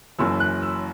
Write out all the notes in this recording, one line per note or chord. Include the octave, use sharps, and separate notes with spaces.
F#1 F#2 E3 E6
F#6
E6